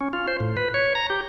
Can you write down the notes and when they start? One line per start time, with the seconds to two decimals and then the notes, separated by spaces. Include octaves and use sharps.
0.01 C#4
0.13 F4
0.28 C5
0.40 A2
0.57 B4
0.74 C#5
0.95 A#5
1.10 G4